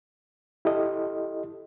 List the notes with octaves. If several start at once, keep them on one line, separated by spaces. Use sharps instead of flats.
E4 G4 A4 D#5